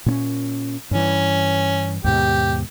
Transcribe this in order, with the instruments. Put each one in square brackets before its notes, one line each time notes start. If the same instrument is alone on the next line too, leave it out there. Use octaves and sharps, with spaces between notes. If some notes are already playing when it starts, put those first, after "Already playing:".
[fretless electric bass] A#2 C4 C#4
[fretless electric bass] G2 E3 [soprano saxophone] C#4
[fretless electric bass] D#2 G#2 B2 [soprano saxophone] G4